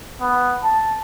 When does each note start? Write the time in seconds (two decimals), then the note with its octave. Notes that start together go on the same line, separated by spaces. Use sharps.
0.21 B3
0.63 A5